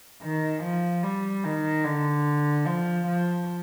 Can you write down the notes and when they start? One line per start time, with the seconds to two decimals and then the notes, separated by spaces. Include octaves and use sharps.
0.22 D#3
0.63 F3
1.03 G3
1.44 D#3
1.84 D3
2.66 F3
3.06 F3